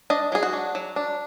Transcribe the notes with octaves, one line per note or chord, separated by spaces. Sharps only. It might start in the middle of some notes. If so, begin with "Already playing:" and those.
D4 D#5
F#3 G#4
F#4
D4
F#3
D4